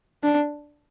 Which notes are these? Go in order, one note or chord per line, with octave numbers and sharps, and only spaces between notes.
D4